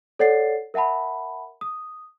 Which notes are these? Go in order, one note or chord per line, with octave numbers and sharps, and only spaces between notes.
A4 C#5 D5 F#5 A6 C7
A#4 E5 F#5 A5 B5
D#6